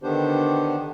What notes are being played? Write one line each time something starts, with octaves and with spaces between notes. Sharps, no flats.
D3 D#3 B3 D4 G4 C5